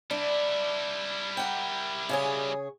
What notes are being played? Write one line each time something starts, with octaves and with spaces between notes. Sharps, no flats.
G3 D4 E4
A#4 F#5 G5
C#3 G#4 C#5